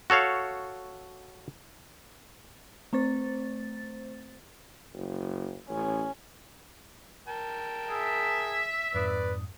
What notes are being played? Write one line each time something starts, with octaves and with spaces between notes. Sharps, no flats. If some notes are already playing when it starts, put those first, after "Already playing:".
F#4 A4 C#5 F5
A3 C4 C5 A6
F#1
A1 C#4
A#4 G5 A5
G#4 E5
F2 G#2 B4 D5 D#6